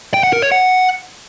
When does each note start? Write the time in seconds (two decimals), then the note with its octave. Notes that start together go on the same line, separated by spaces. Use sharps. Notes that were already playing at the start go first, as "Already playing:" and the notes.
0.14 G5
0.23 F#5
0.33 A#4
0.42 C#5
0.52 F#5